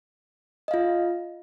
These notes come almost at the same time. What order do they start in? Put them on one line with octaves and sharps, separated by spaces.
D#5 F5 F4